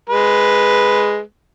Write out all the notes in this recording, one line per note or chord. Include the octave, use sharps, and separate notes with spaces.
G#3 B4